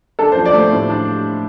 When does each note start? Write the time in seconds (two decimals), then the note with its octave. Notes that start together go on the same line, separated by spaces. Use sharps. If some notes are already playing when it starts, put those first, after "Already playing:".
0.19 D4 A4
0.32 C5
0.36 F3
0.46 D5
0.54 A3
0.59 C5
0.72 A2
0.90 D4